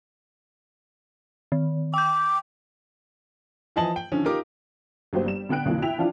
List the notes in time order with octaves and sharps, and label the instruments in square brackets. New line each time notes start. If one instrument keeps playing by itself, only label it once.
[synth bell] D#3
[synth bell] G5 G6 [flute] D6
[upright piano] E3 F3 D#5 G#5 A5 F#7
G5
D3 D#3 F3 C#4
D#4 F4 G4 A#4 D6
[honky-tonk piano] G1 F#3 A#3 G4 C5
G3 E7
D3 B3 G5 F#6 D7
B1 F2 D3 E3 A#3
E4 E5 G5 F7
E3 F3 D4 F4